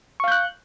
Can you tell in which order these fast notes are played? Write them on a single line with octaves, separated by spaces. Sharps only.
C#6 F5 G6 F#6